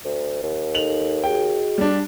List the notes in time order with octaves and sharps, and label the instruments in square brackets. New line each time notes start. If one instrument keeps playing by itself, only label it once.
[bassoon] D2
D#2
[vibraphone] D#4 A4 D#5 [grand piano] F7 F#7
[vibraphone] F#4 G#4 D#5 [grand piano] G5
[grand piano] G3 D4